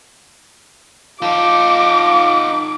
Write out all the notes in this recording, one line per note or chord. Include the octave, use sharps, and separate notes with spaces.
D#4 F4 A4 D6